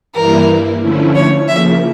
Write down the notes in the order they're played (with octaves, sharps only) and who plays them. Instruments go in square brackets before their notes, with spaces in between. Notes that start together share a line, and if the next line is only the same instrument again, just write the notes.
[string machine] G2 E3 G3 A#3 E4 [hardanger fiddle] A#4
[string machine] D3 F3 A3 C#4 E4
[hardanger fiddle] C#5
[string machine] C#3 F3 A#3 [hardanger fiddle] E5